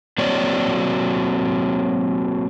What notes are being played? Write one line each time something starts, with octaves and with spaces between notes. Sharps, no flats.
F#3 A#3 C4 F#4 C#5 D5